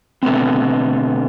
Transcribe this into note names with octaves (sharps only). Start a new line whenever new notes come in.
B2 D3 F3 A3 B3 C4